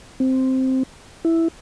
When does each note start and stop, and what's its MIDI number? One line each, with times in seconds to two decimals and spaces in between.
0.20 0.83 60
1.25 1.48 64